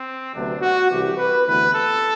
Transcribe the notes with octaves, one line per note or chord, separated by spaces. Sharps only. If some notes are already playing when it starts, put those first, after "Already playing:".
Already playing: C4
D2 C3 F#3 B3 D4
F#4
C2 C3 E3 G4
B4
D2 C3 E3 B3 B4
A4